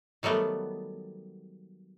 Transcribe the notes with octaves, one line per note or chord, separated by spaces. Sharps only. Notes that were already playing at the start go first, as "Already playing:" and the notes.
D#3 F#3 G3 A3 B3